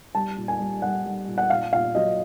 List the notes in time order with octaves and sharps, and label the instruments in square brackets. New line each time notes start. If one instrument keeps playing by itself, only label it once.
[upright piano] G3 A5
A#2
G#5
G3
G3 F#5
G3
A#2
F#5
A#2 F5
A#2 F5
F#3 D#5